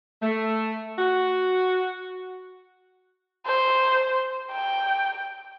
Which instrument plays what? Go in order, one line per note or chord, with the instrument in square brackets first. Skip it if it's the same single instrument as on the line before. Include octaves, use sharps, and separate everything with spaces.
[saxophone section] A3
F#4
[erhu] C5
G5